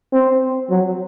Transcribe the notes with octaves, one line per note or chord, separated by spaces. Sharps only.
C4
F#3